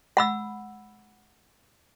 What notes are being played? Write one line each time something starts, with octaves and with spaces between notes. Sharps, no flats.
F#5 B5 E6